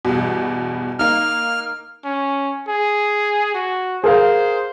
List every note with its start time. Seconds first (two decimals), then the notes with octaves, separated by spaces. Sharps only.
0.05 E2 G2 B2
0.99 A#3 D#4 F6
2.05 C#4
2.68 G#4
3.54 F#4
4.04 G#4 A#4 C5 F5